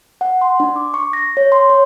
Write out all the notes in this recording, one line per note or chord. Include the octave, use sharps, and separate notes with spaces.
F#5
C6
D4
D6
C#6
A#6
C#5
C6
C#5